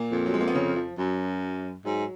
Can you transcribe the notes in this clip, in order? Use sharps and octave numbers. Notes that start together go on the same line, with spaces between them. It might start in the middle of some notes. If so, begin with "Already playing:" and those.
Already playing: A#2 A#3
F2
F#3
G#3
A#3
B3
C#3 C#4
F3
F#2 F#3
G#2 F#3